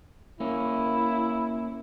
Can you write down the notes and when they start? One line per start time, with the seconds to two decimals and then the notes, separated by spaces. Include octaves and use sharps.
0.40 A#3 C#4 E4